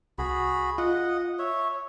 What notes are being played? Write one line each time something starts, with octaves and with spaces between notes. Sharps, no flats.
C2 F#4 G#4 B5
F4 D#5 F#5
C#5 E5